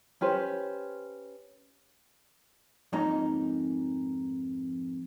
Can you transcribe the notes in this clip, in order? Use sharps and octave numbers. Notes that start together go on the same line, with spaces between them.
C#4 G4 B4 C5
F2 G#2 A#3 C#4 D#4 A#5